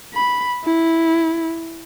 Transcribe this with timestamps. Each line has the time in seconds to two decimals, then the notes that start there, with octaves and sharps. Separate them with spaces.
0.14 B5
0.65 E4